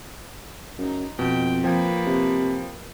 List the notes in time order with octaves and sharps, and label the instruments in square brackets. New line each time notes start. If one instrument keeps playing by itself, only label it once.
[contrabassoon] F#2 [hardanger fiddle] D#4
[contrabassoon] F2 [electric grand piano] B2 [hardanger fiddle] G5
[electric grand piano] F3 G5 G#6 [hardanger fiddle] A#3 B4
[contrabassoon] C3